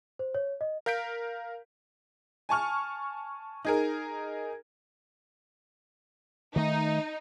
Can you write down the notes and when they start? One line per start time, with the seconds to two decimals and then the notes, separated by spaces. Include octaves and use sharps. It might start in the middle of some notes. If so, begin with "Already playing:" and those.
0.19 C5
0.35 C#5
0.61 D#5
0.86 A#4 F5 G6 B6 D7
2.49 G#5 A5 C#6 F6
3.65 D#4 G#4 A#4
6.56 D#3 A3 D#4